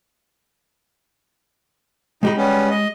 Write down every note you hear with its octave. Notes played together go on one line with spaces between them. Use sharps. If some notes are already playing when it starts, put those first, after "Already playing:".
G#3 D#4 G4 B5
G3 B3 C#4
D#5